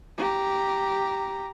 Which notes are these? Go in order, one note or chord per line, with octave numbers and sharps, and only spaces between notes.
G4 A#5